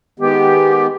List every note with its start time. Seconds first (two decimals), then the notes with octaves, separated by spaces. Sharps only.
0.20 D#3 G#3 B3 G4